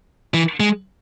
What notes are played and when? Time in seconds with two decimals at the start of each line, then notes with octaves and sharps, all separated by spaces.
0.34 E3
0.60 G#3